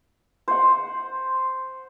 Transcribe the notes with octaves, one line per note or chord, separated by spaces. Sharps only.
C5 F#5